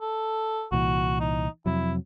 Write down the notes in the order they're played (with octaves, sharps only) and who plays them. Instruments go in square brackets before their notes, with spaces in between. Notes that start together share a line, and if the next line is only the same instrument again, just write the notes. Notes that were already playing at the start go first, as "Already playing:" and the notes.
[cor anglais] A4
[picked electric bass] C2 A#2 E3 [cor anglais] F#4
[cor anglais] D#4
[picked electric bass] F2 C3 F#3 [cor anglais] E4